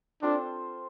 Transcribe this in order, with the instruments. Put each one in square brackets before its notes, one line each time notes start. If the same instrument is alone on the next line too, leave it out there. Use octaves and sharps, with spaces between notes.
[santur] C4 F4 A4 C5 [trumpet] D4